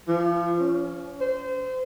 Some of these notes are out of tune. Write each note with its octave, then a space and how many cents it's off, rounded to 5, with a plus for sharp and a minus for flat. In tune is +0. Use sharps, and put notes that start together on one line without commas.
F3 -30
C#4 +25
C5 -25